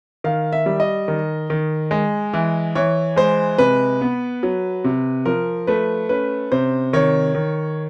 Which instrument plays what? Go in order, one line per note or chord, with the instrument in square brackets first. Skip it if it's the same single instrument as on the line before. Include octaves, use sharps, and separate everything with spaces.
[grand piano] D#3 F5
E5
G3
D#5
D#3
D#3
G#3
E3
E3 C#5
G#3 C5
C3 B4
B3
F#3
C3
F3 A#4
A3 B4
C#4 B4
C3 C5
D#3 C#5
D#3